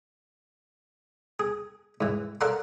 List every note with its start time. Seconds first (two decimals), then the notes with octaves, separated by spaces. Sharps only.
1.39 G#4
2.01 G#2 E3
2.41 A4 A#4 D5 F5 F#5 C6